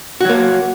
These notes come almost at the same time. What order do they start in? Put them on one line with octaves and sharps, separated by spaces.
F#4 F#3 A#3